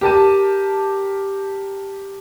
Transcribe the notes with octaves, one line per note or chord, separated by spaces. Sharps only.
G4 A#4 A5 D#7